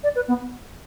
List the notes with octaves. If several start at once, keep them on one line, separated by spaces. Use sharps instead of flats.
D5
B4
B3